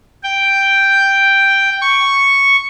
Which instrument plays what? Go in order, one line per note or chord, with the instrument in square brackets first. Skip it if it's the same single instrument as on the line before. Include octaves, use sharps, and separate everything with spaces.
[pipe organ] G5
C#6